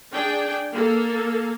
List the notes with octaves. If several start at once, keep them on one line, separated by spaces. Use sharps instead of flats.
D4 G#4 G5
A#3 A4